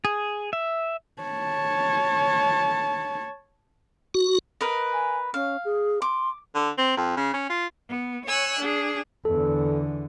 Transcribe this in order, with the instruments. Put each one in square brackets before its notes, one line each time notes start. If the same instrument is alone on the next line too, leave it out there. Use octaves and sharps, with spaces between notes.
[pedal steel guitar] G#4
E5
[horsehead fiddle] C#5 A5
[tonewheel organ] F#4
[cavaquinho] A#4 B4 D#5
[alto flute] G#5
[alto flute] C#4 [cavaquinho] F5
[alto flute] G#4
[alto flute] C6 [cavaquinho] D6
[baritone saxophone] D3
C4
F2
C#3
C#4
F4
[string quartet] B3
C#5 G#5 E6 F#6
D4 G#4
[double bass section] E2 D3 [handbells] A4